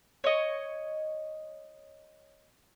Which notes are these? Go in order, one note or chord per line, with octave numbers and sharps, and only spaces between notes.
C#5 D#5